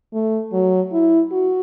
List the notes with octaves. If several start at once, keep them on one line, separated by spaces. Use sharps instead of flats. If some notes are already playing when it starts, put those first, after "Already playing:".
A3
F#3
E4
F#4